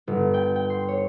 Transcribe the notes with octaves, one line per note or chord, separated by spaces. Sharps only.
G1
G5
G5
C6
C#5